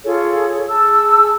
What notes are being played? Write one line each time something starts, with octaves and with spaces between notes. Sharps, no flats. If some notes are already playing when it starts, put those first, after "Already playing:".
F4 G#4 A4 C#5
G#4 A5 E6